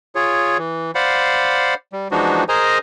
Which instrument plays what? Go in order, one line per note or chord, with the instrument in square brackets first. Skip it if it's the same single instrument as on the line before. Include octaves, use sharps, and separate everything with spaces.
[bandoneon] F4 G#4 C#5
E3
C5 D5 F5 F#5 B5
G3
E3 F3 G#3 D4 D#4 F#4
G#4 A#4 C5 D#5 G#5 A#5